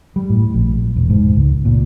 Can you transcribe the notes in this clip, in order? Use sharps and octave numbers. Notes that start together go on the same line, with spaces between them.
G3
A2
A#1
E1
G#2
C#2
A#2